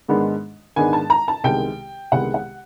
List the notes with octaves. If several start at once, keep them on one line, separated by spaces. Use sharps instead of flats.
G#2 D#3 G#3 B3 D4
G#2 D#3 G#3 B3 D4 G#5
A5
A#5
A5
C2 C3 D#3 G#3 B3 G5
C2 C3 D#3 G#3 B3 F#5
F#5